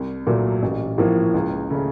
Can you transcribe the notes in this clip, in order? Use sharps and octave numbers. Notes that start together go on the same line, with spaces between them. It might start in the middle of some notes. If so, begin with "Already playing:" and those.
Already playing: C2
A#2 F#3 A3
A1
A2 F3 A#3
C#2
C#3 A3 C#4